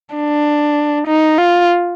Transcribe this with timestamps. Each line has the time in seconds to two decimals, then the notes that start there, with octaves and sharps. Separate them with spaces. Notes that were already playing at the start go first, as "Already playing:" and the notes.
0.16 D4
1.07 D#4
1.38 F4